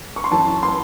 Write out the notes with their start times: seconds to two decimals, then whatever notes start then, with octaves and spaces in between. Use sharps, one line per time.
0.16 C#6
0.24 C6
0.31 F#2 E3 A5
0.63 C6